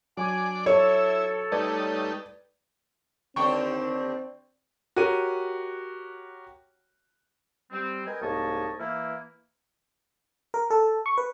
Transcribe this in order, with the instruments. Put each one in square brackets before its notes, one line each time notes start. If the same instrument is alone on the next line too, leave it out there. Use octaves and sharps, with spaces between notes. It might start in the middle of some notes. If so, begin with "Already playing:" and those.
[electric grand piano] F#3 D6 [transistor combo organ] D4 D5 [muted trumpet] G#5
[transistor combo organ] E4 [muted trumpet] A4 [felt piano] C#5
[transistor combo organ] G3 A3 D#4 [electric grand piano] B4 D5 G#6
[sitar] D#2 D3 D4 [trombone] C4 [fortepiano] G5 C#6
[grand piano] F#4 G4 A#4 C#5 D#7
[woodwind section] G3 C4
A#4 B4 D#5 G5 G#5
C2 G#2 A#3 C#5 D#5 A5
E3 A#3 E4
[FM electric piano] A#4
A4
C#6
B4